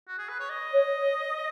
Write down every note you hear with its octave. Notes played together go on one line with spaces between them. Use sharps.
F#4
G#4
B4
C#5
D#5
C#5